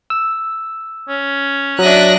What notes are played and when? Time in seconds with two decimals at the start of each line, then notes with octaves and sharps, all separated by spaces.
0.10 E6
1.09 C#4
1.79 F#3 D4 E5 D#6 F#6 A#6